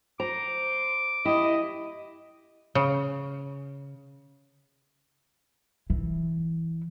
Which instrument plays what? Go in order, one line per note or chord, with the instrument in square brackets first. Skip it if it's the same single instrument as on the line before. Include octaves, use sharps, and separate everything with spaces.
[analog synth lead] C5 [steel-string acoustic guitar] A#5 [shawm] D6
[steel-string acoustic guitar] E4 [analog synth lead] G4 [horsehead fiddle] D#5
[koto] C#3
[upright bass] E3